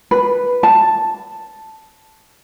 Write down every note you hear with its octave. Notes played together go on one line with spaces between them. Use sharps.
B4
A5